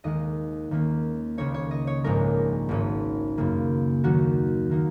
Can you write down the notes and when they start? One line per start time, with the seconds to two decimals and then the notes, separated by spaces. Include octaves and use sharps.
0.04 D#2 D#3 G#3 D#5
0.71 D#2 D#3 A#3 C#4
1.38 C#2 C#3 A#3 D#4 C#5
1.54 C#5
1.71 D#5
1.87 C#5
2.04 A#1 G#2 G#3 D#4 A#4
2.69 G#1 G#2 G#3 C#4
3.38 F#2 C#3 A#3
4.04 D#2 D#3 F#3 F#4
4.70 D#3 A#3 D#4